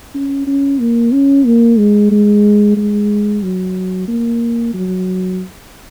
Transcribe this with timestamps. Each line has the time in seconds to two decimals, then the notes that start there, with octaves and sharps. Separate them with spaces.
0.14 C#4
0.47 C#4
0.80 A#3
1.13 C#4
1.46 A#3
1.78 G#3
2.11 G#3
2.76 G#3
3.43 F#3
4.08 A#3
4.74 F#3